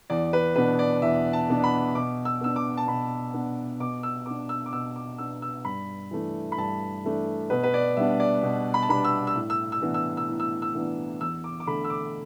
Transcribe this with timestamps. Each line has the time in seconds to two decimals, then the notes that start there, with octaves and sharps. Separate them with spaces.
0.10 E2 D5
0.33 B4
0.56 B2 B3 D4 B4
0.79 D5
1.02 E2 E5
1.33 A5
1.48 B2 B3 D4
1.64 B5
1.95 B2 D6
2.25 E6
2.41 B3 D4 E6
2.56 D6
2.77 A5
2.87 B2 B5
3.34 B3 D4
3.80 B2 D6
4.03 E6
4.26 B3 D4 D6
4.49 E6
4.66 D6
4.72 B2 E6
4.96 D6
5.18 B3 D4 E6
5.42 E6
5.65 G2 B5
6.11 E3 A3 D4
6.52 B5
6.58 G2 A5
7.04 E3 A3 D4
7.50 B2 B4
7.63 B4
7.74 D5
7.97 G3 B3 D4 E5
8.20 D5
8.43 B2
8.74 B5
8.83 A5
8.89 G3 B3 D4 B5
9.04 E6
9.27 E6
9.36 A2
9.50 E6
9.72 E6
9.82 E3 B3 D4
9.94 E6
10.17 E6
10.29 A2
10.40 E6
10.62 E6
10.75 E3 B3 D4
11.21 E2 E6
11.44 D6
11.60 D6
11.67 D3 A3 B5
11.84 E6
11.90 D6